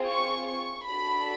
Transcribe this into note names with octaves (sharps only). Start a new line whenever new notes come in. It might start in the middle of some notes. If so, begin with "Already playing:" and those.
Already playing: C4 F4 G#4
C#6
C#6
D4 F#4 A4 B5